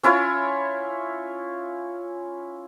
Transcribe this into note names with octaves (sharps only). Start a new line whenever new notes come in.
C#4 E4 F4 C#5